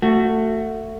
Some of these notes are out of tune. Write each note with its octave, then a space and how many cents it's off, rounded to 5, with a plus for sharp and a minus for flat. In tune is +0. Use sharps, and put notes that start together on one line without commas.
A3 +20 F#4 +0